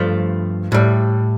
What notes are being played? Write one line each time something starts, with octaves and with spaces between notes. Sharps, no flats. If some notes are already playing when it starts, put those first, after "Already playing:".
Already playing: G2 F3 A3
A2 G3